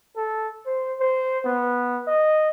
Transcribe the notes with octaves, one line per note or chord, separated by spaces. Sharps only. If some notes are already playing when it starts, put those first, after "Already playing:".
A4
C5
C5
B3
D#5